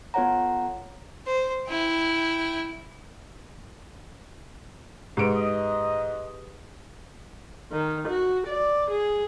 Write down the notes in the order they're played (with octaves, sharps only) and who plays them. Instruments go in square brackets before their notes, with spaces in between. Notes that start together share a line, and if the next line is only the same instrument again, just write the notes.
[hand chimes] B3 F4 A4 C#5 F#5 A#5
[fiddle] C5
E4 G5
[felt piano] G#2 D7 [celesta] G4 G#4 B4 [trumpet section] D#5
[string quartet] D#3
F#4
D5
G#4